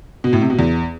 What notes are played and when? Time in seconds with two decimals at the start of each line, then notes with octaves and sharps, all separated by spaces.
0.24 B2
0.33 A2
0.41 C3
0.50 B2
0.59 E2